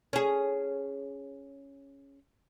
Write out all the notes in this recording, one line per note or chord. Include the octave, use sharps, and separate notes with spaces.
C#4 G#4